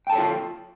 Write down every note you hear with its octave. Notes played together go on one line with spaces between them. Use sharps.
F4 A4 C#5 G5 A5